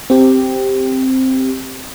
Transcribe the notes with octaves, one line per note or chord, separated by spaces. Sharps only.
C4 G4